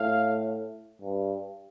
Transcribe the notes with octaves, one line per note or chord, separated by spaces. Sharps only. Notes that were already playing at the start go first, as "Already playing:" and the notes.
Already playing: A2 F5
G2